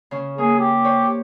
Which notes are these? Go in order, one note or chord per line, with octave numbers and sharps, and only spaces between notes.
C#3 C#4
A#3 G#4
G4
C5 C#5